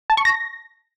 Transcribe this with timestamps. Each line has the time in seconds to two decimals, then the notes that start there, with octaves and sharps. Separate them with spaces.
0.10 A5
0.17 C#6
0.25 A#6